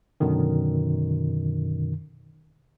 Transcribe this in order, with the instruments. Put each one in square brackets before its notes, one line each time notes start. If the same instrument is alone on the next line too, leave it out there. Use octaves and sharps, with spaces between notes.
[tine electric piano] F#2 B2 D3 D#3